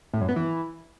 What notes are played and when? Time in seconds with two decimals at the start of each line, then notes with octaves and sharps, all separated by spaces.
0.14 A2
0.21 F#2
0.29 B3
0.36 E3